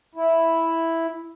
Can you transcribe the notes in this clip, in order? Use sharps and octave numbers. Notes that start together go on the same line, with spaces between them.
E4